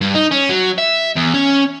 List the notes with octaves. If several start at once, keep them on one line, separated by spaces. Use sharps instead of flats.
G2
D#4
C#4
F#3
E5
E2
C#4